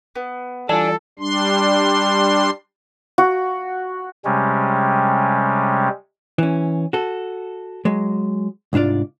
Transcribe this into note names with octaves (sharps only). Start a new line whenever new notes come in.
B3
E3 G3 F4 A4 D5 G#5 A5
G3 D4 C6
F#4
C3 G3 G#3 C#4
E3 C#4
F#4 A4
F#3 G#3
C2 G#2 D4 F4 D5